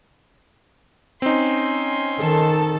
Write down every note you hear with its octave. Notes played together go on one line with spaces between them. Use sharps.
C4 C#4 D#4 C6
D#3 A4 A5